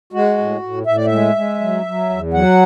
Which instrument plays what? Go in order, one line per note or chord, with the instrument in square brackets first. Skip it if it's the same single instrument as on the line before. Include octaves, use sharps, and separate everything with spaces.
[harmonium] G#3 F#4
A2
A2
A2 E5
D5
E5
G#3
G#3
F#3
F#3
E2
F#3 F#5